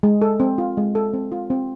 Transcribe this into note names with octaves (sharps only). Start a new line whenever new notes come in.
G#3
A4
C4
F4
G#3
A4
C4
F4
C4